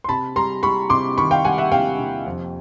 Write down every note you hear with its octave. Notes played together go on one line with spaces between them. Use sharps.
C6
C3 A5 B5
G3 A#5 C6
G3 B5 C#6
C3 C6 D6
D#3 B5 C#6
F5 G5
G3 F#5 G#5
E5 F#5
C3 F5 G5
C3
F2